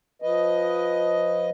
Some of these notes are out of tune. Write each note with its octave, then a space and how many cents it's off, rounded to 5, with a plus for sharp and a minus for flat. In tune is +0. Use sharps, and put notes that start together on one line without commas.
F3 +15 B4 +0 D#5 +5